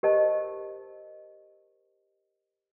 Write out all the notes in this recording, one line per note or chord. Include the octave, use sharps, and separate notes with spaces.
G4 A#4 C5 D#5 A5